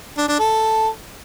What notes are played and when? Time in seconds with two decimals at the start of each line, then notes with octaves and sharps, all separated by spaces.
0.18 D4
0.28 D4
0.39 A4